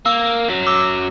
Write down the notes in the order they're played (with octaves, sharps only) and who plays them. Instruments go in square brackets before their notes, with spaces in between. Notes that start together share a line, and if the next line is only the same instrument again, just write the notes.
[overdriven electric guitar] A#3 [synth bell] E6
[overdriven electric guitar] F#2 F#3
[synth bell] D6 E6